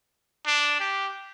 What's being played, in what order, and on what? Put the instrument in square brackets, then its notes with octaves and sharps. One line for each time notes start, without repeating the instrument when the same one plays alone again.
[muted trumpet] D4
G4